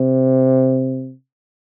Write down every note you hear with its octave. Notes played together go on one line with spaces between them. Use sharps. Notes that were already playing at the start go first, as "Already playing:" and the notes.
Already playing: C3